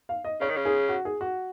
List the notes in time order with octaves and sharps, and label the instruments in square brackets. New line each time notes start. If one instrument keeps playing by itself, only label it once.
[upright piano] F5
D#5
[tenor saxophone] C#3 [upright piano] C#5
[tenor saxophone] D#3
C#3
[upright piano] G#4
F#4
G#4
F#4